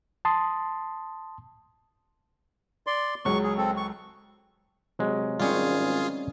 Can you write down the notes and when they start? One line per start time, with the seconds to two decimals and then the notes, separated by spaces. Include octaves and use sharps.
0.25 A5 C6 D#6
2.87 D5 C6
3.25 C#2 F#3 G#3 C#6
3.43 G#4
3.58 C4 A4
3.77 C#6
4.99 C3 F#3 G#3
5.40 G#1 G3 C4 C#4 F4 G#4